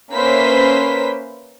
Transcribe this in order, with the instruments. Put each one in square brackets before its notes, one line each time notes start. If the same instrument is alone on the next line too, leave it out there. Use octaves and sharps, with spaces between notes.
[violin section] A#3 C#4 B4 C5 E5 B6